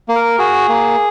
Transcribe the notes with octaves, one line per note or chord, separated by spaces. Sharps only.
A#3
A#4
F#4 G#4
A#3